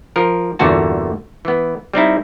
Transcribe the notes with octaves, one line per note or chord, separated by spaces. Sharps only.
F3 A#4
G1 E2 A#2 D3 F#4 A5
E3 B3
G3 C4 D#4 E4